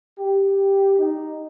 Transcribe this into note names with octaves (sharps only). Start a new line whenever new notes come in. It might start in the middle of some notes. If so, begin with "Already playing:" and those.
G4
D#4